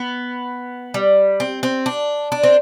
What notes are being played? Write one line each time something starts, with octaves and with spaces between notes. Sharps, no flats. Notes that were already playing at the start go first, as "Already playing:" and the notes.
Already playing: B3
G3
C4
C4
D4
D4
C4